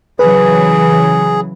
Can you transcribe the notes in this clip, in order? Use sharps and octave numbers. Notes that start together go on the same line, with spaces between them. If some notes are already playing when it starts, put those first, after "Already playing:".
C#3 E3 F#3 G#4 B4